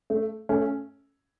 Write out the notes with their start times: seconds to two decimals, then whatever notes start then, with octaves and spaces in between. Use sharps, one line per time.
0.10 A3
0.49 A3 C#4